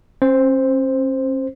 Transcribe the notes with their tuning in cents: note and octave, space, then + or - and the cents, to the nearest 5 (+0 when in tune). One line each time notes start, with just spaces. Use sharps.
C#4 -45 C5 +0